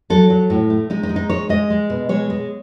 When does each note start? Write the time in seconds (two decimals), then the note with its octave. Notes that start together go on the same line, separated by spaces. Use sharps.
0.10 F#3 A4
0.30 F#3
0.50 A2
0.70 A3
0.90 G#3 D#4
1.03 D#4
1.09 G#3
1.16 D#4
1.30 G#3 C#5
1.49 G#3 D#5
1.70 G#3
1.90 B2
2.09 G#3 C#5
2.30 G#3